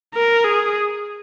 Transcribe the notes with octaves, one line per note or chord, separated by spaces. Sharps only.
A#4
G#4